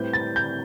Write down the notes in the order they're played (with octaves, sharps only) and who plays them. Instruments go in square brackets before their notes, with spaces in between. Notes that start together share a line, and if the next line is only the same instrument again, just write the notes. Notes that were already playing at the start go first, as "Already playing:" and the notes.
Already playing: [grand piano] A2 G3 C4 G4 B4 [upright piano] G6
[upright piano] A6
G6